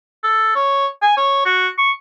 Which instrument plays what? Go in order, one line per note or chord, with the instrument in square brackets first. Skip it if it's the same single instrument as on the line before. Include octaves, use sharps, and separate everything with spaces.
[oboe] A4
C#5
G#5
C#5
F#4
C#6